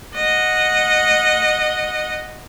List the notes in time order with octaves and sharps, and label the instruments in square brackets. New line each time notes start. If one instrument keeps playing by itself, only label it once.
[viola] D#5 F#5